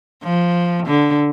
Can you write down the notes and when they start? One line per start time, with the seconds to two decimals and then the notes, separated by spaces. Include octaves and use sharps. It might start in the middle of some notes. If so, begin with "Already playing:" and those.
0.23 F3
0.86 D3